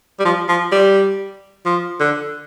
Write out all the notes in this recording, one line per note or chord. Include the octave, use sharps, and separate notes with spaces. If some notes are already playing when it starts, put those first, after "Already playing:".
G3
F3
F3
G3
F3
D3